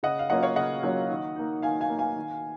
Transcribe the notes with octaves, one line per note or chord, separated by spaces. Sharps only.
C#3 D#5 F#5
F5
F#3 A#3 C#4 F4 D#5 F#5
C#5 F5
C#3 D#5 F#5
F#3 A#3 C#4 F4
D#3
A#3 D#4
D#3 F5 G#5
F5 G#5
A#3 D#4
F5 G#5
D#3